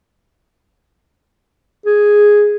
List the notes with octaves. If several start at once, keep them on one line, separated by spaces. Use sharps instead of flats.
G#4